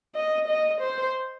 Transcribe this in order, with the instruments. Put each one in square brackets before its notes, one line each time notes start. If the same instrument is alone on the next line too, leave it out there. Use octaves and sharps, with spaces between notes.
[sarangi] D#5
D#5
C5